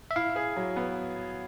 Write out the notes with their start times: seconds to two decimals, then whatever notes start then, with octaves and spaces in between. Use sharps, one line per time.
0.11 E5
0.16 E4 F5
0.36 G#4
0.56 F#3
0.76 B3